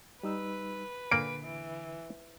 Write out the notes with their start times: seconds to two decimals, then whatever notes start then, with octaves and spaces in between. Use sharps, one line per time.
0.23 G3 D#4 B4 E6
1.11 A#2 D3 A#3 D7
1.44 E3